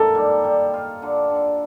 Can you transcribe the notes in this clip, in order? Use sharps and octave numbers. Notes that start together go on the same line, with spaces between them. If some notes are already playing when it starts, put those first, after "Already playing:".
Already playing: D#3 A#3 A4
G3
G3
F4
D3
D3